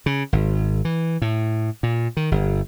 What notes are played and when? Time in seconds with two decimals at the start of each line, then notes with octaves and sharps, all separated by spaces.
0.06 C#3
0.33 G#1
0.85 E3
1.22 A2
1.83 A#2
2.17 D#3
2.32 G1